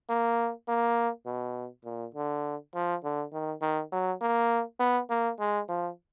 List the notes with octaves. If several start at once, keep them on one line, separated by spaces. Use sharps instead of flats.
A#3
A#3
B2
A#2
D3
F3
D3
D#3
D#3
F#3
A#3
B3
A#3
G#3
F3